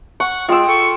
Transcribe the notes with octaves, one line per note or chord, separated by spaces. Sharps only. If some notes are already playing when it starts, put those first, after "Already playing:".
F#5 C#6
G#3 F4 G5 E6
A4 C#6